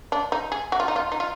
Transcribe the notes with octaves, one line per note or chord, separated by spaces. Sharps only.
D4
D#4
G#4
F#4
F4
D#4
F4
D#4
F4